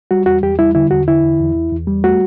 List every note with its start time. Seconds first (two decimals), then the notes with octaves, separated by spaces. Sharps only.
0.11 G3 F#4
0.26 E2 F#4
0.43 E2 G4
0.59 G3 E4
0.75 D3 E4
0.91 E2 F#4
1.08 D3 E4
1.23 E2
1.40 E2
1.55 E2
1.72 E2
1.87 G3
2.04 A3 F#4